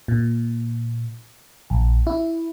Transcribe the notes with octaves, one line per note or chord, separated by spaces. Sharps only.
A#2
A#1
E4